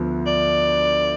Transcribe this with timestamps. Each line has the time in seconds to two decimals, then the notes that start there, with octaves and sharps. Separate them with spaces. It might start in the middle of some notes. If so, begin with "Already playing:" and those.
Already playing: D2 D3 F3 B3
0.27 D5